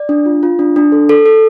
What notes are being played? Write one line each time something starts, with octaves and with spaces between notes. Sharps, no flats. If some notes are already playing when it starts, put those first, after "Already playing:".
Already playing: D5
D4
F4
F4
D4
D4
A4
A4
A4